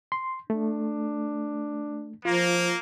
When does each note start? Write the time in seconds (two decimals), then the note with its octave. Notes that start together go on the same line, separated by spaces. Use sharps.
0.12 C6
0.50 A3 D4
2.25 F3 A#3 F4